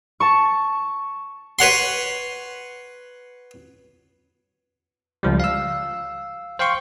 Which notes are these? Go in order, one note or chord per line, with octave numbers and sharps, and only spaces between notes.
A5 C#6
B4 C#5 F#5 C6
C#2 F3 G3
F5 E6
C5 F5 G5 C6 C#6